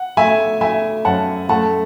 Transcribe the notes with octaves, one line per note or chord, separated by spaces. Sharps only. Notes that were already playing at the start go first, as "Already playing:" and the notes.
Already playing: F#5
A3 E5 G#5
A3 E5 G#5
F#2 F#5 A5
A3 F#5 A5